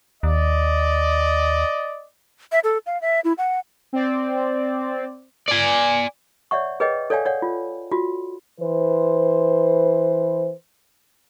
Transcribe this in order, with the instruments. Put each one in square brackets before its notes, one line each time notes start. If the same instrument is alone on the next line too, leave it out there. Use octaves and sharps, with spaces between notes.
[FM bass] D#2 [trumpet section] D5 D#5
[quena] E5
A4
F5
E5
E4
F#5
[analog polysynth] C4 D5
[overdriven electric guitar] D5 G#5
[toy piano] C#5 D5 E5 F#5 C#6
G#4 B4 C#5 D#5 G5
A4 C#5 D5 F5 G5 G#5
C#5 D5 F#5
F4
F4 F#4
[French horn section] E3 B4 C5